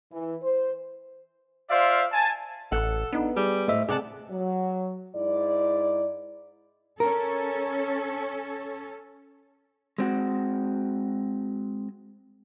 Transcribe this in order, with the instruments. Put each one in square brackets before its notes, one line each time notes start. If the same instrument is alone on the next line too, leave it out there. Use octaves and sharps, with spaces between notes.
[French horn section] E3
C5
[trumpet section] F4 C5 D5 E5 F5
G#5 A5
[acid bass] A1 [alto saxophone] A4 [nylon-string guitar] F#5
[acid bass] B3 [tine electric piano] D4 D#4
[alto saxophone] G3 [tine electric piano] G#4
[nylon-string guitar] A2 D#5 [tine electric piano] A3 C5 E5
[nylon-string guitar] C3 F#5 A5 [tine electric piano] G#4 [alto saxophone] D5
[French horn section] F#3
G#2 E4 D5
[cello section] C#4 A4 [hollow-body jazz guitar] A#4
[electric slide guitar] G#3 C4 F#4